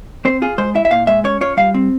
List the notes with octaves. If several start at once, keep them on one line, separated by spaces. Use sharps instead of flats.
C4 C5
F4 G#4
G#3 C5
E4 E5
E5
A#2 F5
G#3 E5
C#4 C#5
F4 C#5
G3 F5
C4